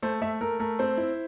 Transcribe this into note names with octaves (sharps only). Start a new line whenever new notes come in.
A3 C5
A3 E5
A3 A#4
A3 A#4
C4 C5
E4